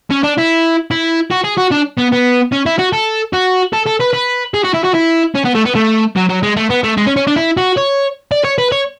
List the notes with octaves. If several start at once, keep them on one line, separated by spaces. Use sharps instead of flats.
C#4
D4
E4
E4
F#4
G#4
F#4
D4
B3
B3
C#4
E4
F#4
A4
F#4
A4
A4
B4
B4
G#4
F#4
E4
F#4
E4
C#4
B3
A3
B3
A3
F#3
F#3
G#3
A3
B3
A3
G#3
C#4
C#4
D4
E4
F#4
C#5
D5
C#5
B4
C#5